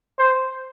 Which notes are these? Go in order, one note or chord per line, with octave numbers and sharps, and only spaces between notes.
C5